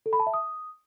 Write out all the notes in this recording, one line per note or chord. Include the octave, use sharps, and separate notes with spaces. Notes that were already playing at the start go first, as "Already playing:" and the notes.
A4
B5
A5
E5
D#6